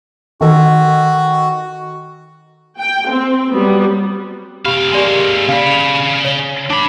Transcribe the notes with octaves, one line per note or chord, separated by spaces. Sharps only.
D#3 F#4 A4
G5
C4
F#3 G3 B3
C3 G4 F5 B5
G#3 A#3 G4 D5 G#5
C#3 D5 F5 B5
C#5 G7
D4 B5 D6